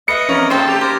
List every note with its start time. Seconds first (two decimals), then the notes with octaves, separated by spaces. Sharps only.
0.08 B4 D#5 E5 C#7
0.29 E2 C#4 A#4
0.50 A2 D#4 A4 C5 G5
0.68 G4
0.81 A#4 C5